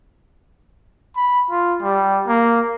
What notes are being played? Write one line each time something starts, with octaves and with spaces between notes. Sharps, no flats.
B5
F4
G3
A#3